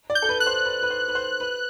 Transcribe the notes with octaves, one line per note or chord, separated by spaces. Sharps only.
D5
G6
A4
B4
F#6
C5
B4
B4
C5
B4
C5
B4